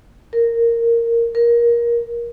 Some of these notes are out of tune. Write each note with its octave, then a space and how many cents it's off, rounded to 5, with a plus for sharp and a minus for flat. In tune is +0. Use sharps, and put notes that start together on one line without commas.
A#4 -10
A#4 +20